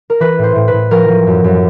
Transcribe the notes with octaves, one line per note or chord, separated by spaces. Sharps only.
A#4
E3 B4
A2
C5
A2
B4
A2
F3 A#4
F3
F#2
F#2